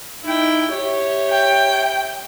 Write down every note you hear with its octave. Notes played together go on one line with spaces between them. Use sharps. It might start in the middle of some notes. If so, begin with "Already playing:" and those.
D#4 E4 G5
G4 C#5 E5
G5